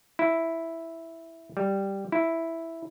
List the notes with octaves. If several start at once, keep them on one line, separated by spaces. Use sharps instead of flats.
E4
G3
E4